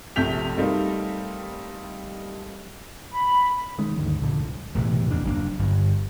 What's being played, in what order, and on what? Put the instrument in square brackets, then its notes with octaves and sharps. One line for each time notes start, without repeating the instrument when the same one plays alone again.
[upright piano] A#1 C3 A3 G6 B6 F7
G3 A3 A#3 C4 D#4
[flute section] B5
[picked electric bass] D#3 G#3 C#4
D2 G2 D#3
F1 C2 A#2 D3
[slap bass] E1 A2 C3 E3
E2 A#3 D4
F#1 F#3 A#3 D4
G1 G2